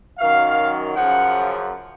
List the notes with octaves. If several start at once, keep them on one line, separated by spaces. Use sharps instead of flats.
F#2 D#3 F#3 F5
F#2 C#3 F3 F#5